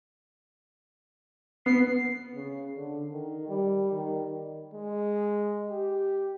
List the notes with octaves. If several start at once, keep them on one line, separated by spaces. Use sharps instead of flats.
B3 C7
C#3
D3
D#3
G3
D#3
G#3
G4